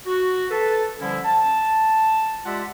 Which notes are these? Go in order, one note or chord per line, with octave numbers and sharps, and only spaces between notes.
F#4
A4 B4 A5
D3 F3 G3 C#4 E4
A5
G#3 F4 G4 D5 E5 F#5